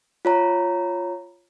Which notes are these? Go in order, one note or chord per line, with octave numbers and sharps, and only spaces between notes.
F4 C#5 A#5